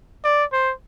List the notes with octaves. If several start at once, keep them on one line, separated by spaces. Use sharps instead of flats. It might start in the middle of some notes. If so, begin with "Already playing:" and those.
D5
C5